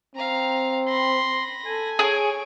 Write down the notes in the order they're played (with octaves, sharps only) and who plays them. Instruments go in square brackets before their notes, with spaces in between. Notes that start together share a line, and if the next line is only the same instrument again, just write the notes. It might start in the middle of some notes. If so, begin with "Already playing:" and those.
[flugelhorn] C4 [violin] F5 A#5
[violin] B5 A#6 [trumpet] C6
[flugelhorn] A4 [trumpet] G#5
[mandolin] G#4 [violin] C#5 D7